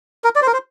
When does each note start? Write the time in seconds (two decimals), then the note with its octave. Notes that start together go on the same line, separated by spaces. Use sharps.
0.24 A#4
0.35 D5
0.42 C5
0.47 A#4
0.53 C5